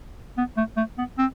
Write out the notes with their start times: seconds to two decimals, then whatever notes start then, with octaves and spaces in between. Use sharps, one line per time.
0.37 B3
0.57 A3
0.77 A3
0.98 B3
1.18 C4